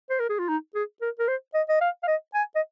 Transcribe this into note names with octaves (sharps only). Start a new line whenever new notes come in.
C5
A#4
G#4
F4
D#4
G#4
A#4
A#4
C5
D#5
D#5
F5
F5
D#5
G#5
D#5